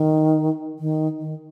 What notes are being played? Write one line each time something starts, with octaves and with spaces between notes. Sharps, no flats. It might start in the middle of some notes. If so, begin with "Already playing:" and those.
Already playing: D#3
D#3
D#3